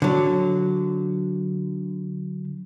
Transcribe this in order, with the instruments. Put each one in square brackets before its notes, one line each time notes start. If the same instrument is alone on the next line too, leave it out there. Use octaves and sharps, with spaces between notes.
[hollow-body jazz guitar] D3 F#3